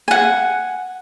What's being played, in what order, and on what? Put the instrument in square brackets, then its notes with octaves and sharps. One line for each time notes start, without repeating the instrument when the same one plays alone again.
[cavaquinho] F#5 G#5